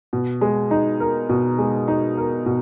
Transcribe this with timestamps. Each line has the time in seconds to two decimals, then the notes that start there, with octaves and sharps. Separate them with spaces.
0.13 B2
0.41 G#3
0.71 D#4
1.00 A#4
1.29 B2
1.58 G#3
1.88 D#4
2.18 A#4
2.46 B2